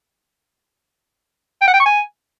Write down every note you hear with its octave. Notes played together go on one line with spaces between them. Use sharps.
G5
F#5
G5
C#6
G#5